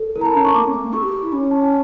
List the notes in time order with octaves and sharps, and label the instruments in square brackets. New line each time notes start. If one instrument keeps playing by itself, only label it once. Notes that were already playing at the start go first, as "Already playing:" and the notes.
Already playing: [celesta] A4
[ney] E4 [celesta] A#4
[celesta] A#5
A5
[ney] C#4 [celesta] A#5
[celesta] C#6
[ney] A#3 [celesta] D6
[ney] C#4
A3
A#3
[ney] A4 [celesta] C#6
[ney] G4
E4
C#4
[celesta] A5